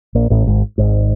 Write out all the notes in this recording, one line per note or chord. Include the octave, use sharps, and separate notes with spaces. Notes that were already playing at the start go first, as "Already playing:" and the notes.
A#1 A#2
A1 A2
G#1 G#2
G#1 G#2